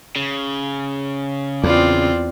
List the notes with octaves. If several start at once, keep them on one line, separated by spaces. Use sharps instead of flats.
C#3
E2 C4 F4 D5